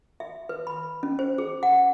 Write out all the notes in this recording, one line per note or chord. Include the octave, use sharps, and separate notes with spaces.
E5
B4
B5
C#4
C5
G#4
F#5